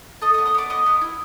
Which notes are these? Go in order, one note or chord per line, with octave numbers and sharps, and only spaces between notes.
A4 D#5 D#6
D#5 D#6
B3
D#5 D#6
B3 D5 D6
B3 D#5 D#6
B3
E4